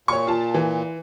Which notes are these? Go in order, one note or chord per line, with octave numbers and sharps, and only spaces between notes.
A#2 C#5 C#6
F4 A5
E3